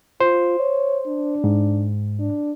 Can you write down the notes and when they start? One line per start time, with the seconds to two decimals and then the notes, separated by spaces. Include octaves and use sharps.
0.20 F4 C5
0.59 C#5
1.07 D4
1.44 G#2
2.19 D4